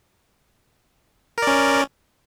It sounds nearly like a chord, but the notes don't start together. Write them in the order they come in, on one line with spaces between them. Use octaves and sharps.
A#4 D5 C#4